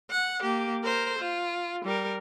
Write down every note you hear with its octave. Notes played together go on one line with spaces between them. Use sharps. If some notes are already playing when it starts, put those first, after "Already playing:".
F#5
A#3 G4
A#4 C5
F4
G3 A#4